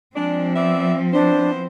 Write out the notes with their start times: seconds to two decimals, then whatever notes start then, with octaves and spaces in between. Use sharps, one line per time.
0.16 F3 G#3 C4 D4
0.56 B3 D5 E5
1.13 B3 D4 E4 C5